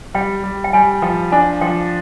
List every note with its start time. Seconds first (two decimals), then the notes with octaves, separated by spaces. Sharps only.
0.14 G3 G5
0.44 G3
0.64 G5
0.73 G3 G#5
1.02 F3 G5
1.32 D4 G#5
1.61 F3 G5